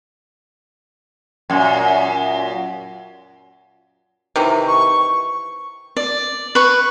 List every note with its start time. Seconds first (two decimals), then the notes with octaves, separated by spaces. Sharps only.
1.50 F#2 A#2
4.36 C3 D#3 E3
4.68 C#6
5.97 D5
6.55 B4 C#6